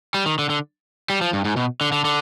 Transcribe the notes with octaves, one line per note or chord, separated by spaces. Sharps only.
G3
D#3
D3
D3
G3
F3
G2
G#2
B2
D3
D3
D3